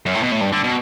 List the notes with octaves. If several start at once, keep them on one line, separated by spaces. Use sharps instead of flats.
F#2
A2
B2
A2
G2
D3
B2